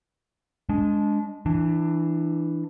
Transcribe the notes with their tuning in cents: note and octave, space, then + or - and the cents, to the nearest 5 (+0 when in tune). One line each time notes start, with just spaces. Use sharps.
G#3 +0 D4 -20
E3 +0 D4 +20